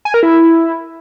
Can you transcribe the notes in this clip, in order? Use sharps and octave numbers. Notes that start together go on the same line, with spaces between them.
G#5
A#4
E4